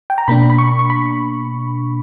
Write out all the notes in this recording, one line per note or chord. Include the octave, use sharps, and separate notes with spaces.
G5
A#5
B2 A#3 D4 B5
B5
C#6
C#6
B5